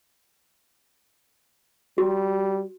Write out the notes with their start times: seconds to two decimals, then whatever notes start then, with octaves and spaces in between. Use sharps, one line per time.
1.98 G3 F#4